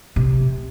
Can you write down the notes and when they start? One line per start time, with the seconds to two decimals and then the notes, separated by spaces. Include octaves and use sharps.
0.16 C3